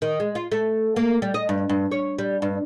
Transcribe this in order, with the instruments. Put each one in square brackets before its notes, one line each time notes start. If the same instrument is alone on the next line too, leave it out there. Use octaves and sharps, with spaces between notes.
[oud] D#3
G#3
F4
A3
A#3
G3
D#5
G2
G2
C#5
G3
G2